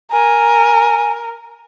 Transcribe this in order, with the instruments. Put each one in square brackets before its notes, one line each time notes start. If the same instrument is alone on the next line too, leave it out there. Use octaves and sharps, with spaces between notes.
[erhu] A#4 [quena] G#5